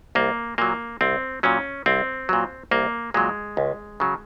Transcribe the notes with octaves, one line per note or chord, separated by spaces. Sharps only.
C2 A#3
A#2 F#3 A#3
C2 C4
A#2 F#3 C#4
C2 C4
A#2 F#3
C2 A#3
A#2 F#3 G#3
C#2
C#3 F#3